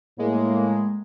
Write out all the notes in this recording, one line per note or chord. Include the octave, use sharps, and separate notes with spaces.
A2 G#3 A#3